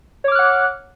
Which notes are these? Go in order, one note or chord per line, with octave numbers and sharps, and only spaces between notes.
C#5 F#5 D6 F6 F#6